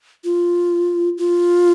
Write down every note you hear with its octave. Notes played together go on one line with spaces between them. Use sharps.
F4
F4